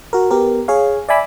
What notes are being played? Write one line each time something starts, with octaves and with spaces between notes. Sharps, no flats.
F#4 A#4
B3 G4 A#4
G#4 C#5 F5
D5 E5 G#5 B5 D6 E6